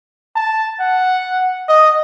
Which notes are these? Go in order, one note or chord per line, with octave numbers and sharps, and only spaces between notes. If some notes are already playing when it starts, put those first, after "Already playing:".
A5
F#5
D#5